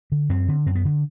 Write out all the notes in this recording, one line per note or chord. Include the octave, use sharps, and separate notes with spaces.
D3
F#2 C4
D3
F#2 C4
B3
D3